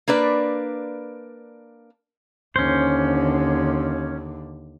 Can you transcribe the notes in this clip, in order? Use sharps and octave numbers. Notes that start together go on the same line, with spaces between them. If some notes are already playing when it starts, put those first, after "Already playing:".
A#3 D4 B4 D5
D#2 D3 C#4 C5